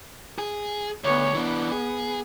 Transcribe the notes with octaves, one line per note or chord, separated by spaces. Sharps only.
G#4
D2 B3 C#5
E3 B3 D4
G#4